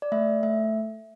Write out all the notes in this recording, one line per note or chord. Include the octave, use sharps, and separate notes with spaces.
D5
A3 E5
A3 E5